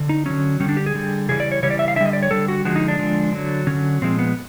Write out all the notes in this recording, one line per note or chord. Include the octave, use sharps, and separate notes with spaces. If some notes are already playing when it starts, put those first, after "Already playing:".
Already playing: D3
D#4
D3 F#3 C#4
D3 G3 C#4
D4
G4
G#4
D3 G3
C#3 E3 G3 G#4
D5
C#5
C#3 E3 G3 C#5
D5
E5
F5
D3 G3 D#5 E5
D5
C#5
D3 G3 A4
F#4
D3 F3 G#3 F#4
D#4
D4
D3 F3 G#3
D3 F#3
D3 F#3 C#4
A#2 F3 G#3 C4
B3